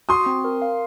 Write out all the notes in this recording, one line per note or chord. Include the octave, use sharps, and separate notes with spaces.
F#4 C6 D#6
C4
A#4
F5